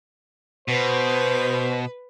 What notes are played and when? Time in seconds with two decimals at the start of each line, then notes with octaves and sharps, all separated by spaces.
0.68 B2 B4 C5